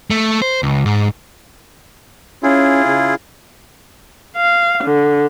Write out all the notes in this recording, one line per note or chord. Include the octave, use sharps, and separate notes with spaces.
A3
C5
C#2
G#2
C#4 E4 F4 G#4
C#3
F5
D3